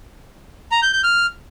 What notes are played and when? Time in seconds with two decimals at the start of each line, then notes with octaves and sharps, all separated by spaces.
0.72 A#5
0.82 G6
0.93 G6
1.04 F6